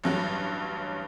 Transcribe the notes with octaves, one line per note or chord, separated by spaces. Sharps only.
A1 G2 F#3